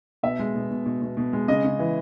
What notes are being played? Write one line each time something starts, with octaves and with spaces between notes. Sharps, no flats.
B2 E5
G#3
B2
B2
B2
B2
B2
G#3
C#3 D#5
C#3
E3